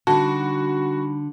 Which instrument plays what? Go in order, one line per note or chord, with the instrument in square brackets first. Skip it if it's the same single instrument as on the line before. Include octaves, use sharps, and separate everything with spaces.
[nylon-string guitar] D3 [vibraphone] G3 D#4 B5 [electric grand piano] F#4 [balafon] A5